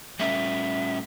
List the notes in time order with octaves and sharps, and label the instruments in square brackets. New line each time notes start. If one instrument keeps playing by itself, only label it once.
[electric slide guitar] G3 A3 C#4 [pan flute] E5